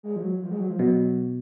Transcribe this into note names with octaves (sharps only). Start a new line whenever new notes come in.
G#3
F3
F#3
F3
G#3
F#3
F3
B2 F#3